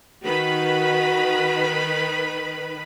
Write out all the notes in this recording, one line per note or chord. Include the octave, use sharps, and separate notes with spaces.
D#3 F#4 B4 B5